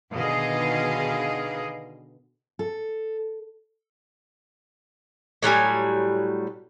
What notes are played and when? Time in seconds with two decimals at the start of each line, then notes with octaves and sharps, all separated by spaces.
0.13 B2 D3 D#3 G#4 D#5 F5
2.59 A4
5.43 A2 F#3 G3 G#5